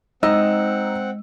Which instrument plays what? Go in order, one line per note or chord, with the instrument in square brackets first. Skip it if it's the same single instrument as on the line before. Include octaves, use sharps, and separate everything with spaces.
[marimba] G#3 [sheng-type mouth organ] C4 F#5 [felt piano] D#4 E6 [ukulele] D#5